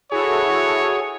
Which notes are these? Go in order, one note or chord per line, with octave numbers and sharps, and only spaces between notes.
E4 F#4 G#4 A4 C#5